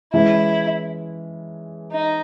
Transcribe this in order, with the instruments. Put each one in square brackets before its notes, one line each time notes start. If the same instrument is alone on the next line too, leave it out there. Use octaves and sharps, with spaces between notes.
[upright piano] E3 G#3 C#4 [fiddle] E4
[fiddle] D#4